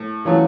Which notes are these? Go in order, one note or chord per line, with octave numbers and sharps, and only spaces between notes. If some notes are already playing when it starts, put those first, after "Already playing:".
Already playing: A2
E3 F#3 A3 C#4 F4